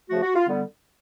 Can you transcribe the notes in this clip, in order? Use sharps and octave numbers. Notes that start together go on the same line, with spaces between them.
C#3 F3 A3 F#4
F#4
F4
D3 G3 B3